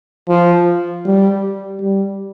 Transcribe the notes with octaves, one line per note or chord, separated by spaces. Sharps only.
F3
G3
G3